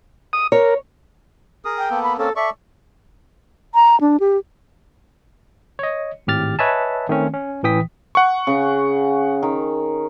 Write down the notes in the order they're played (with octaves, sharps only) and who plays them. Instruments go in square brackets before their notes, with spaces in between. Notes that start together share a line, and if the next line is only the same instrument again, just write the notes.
[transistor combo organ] D#6
[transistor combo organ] A#4 [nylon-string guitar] C#5
[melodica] G#4 A#4 D#6
[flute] G5
[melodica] A#3 B3 A4
[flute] B5
[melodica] A#3 C4 C#4 [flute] A4
[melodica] A4 D5 C#6 [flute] E5
[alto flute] A#5
D4
G4
[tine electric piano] C#5 D#5
G#1 A2 G4 F6 A6
B4 C#5 D#5 E5 G#5 A5
D#3 A3 C4 C#4
C#4
A1 A2 E3 G5 D#6 B6
[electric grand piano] F#5 C#6
[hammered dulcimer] C#3
D#3